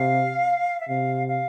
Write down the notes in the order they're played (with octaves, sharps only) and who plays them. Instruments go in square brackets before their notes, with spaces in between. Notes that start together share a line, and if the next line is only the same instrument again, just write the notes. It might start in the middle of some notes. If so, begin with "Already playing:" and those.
Already playing: [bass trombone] C3 [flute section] F5
[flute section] E5
[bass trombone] C3 [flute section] F5
[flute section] F5